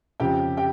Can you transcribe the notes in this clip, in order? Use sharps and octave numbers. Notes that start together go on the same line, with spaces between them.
F2 C#3 G4 G5
G4 G5